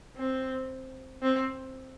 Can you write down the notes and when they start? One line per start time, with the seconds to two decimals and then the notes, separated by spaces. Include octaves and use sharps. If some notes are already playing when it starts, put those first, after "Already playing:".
0.17 C4
1.23 C4